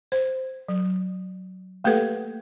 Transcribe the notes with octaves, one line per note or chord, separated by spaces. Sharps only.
C5
F#3
A3 A#3 G4 A4 B4 F#5